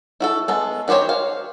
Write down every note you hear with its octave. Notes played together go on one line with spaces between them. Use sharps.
E4 F#4 A4
G#3 B3 A4
D#3 F#4 G4 C5 C#5
F#4 F5